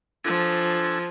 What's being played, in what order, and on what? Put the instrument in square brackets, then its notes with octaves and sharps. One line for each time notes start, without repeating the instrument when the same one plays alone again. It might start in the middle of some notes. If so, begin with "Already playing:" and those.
[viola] F3 [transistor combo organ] D4 A4 G#5